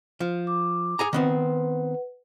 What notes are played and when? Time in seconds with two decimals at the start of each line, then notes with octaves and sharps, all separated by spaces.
0.20 F3
0.47 D6
0.99 G#4 G#5 A#5
1.13 D#3 B3 C4 B4 F#5